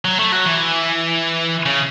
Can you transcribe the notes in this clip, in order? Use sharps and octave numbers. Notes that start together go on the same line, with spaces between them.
F#3
A3
F#3
E3
C#3